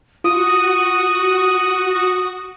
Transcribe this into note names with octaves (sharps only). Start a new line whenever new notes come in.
F4 F#4 D#6